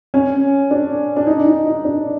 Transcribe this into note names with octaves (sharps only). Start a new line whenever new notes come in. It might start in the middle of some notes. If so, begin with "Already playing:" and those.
C#4
D4
D4
D#4
D#4
D#4
D4